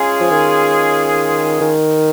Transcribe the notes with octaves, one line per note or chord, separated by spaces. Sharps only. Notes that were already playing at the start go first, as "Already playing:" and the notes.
Already playing: G#3 C#4 F4 G#4
F3
D#3
D#3